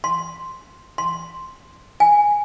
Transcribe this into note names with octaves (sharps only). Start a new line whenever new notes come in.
C6
C6
G#5